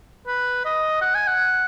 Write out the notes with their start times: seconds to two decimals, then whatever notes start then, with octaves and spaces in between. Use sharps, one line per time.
0.27 B4
0.65 D#5
1.02 F#5
1.15 G#5
1.27 F#5